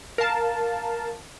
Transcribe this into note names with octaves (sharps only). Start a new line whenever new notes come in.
A#4 F5 A5